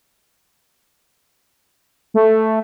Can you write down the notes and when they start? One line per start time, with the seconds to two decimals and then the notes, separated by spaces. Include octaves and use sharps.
2.14 A3